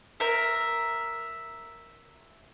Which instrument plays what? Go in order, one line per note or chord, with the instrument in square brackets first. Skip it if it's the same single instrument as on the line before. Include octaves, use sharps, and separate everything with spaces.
[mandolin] A#4 E5